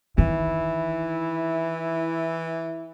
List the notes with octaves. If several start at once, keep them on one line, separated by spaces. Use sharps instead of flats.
D#3 E3 E4